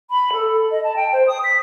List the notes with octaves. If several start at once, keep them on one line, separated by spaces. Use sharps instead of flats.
B5
A4
D#5
A5
G5
C5
D#6
B6